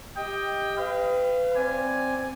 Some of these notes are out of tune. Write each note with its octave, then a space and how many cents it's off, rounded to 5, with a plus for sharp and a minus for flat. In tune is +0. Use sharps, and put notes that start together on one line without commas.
G4 +15 D#5 +10 G5 +10
B4 +30 F5 -25
C4 +0 D5 +0 G#5 +0